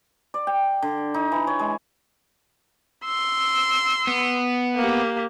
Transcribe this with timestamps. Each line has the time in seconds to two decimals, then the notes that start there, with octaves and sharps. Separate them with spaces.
0.34 D5
0.47 G5
0.82 D3
1.14 D#4
1.32 E3
1.47 C#5
1.59 G#3
3.05 C6 E6
4.08 B3
4.76 A#3 G4